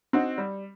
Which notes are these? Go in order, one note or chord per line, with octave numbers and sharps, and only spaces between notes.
C4 D#4 F#4
G3